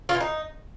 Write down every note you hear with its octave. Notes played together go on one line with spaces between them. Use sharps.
F4
E3
D#4